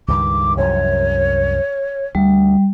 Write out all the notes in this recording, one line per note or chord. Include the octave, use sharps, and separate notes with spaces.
C#2 G2 D#3 D6
C2 F#2 F3 C#5
D2 G3